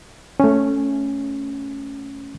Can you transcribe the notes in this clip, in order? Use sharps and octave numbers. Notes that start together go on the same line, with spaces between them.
A3 C#4